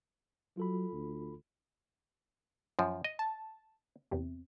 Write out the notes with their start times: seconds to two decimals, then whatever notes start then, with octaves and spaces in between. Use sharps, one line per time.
0.57 F#3 F4 A4 B5
0.93 D2
2.79 F#2 F3
3.04 D#5
3.19 A5
4.11 E2 C3